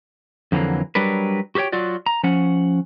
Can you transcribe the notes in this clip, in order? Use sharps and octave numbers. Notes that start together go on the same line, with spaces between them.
F2 D3 E3 F#3 A#3
F#3 G3 D4 A#4 B4
F#4 G4 A#4 C#5 G5
F#3 F4 F#4 D5
A#5
F3 C#4 F#5